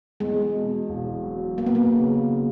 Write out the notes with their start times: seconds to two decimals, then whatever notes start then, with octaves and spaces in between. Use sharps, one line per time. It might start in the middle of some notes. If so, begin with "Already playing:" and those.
0.20 E2 G#3
0.55 B2
0.89 E1
1.23 F#3
1.58 E2 A#3
1.66 B3
1.75 A#3
1.93 C#3